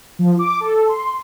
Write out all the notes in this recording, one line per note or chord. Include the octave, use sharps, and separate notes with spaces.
F3
D6
A4
C6